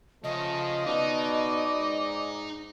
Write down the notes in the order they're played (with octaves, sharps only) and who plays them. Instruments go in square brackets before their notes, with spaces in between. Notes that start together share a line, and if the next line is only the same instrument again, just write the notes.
[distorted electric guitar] C#3 [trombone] F3 [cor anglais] A3 [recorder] D#5
[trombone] B2 [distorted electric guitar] D#4 [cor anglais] D5
[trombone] G#2